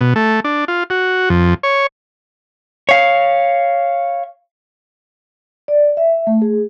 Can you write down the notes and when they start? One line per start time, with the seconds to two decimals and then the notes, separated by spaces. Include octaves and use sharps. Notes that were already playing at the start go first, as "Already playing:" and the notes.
0.01 B2
0.16 A3
0.44 D4
0.68 F4
0.90 F#4
1.30 F2
1.63 C#5
2.89 C#5 F5
5.68 D5
5.97 E5
6.27 A3
6.42 G#4